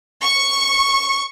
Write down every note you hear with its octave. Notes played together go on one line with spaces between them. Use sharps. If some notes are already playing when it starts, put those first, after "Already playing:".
C#6